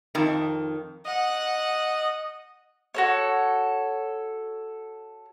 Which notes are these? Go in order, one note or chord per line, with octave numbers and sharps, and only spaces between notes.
F2 D#3
D#5 F#5
F#4 A4 C#5